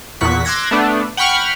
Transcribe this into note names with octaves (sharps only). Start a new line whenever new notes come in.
E2 A#2 F#5 C#6 B6
C6 D6 E6 F#6 G#6 A#6
A3 B3 D4
F#5 G5 B5 C#6 F6